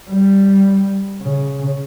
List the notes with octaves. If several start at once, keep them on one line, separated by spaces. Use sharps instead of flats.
G3
C#3